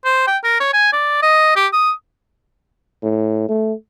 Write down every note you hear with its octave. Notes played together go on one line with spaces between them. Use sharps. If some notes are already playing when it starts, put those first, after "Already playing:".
C5
G5
A#4
C#5
G#5
D5
D#5
G4
D#6
A2
A3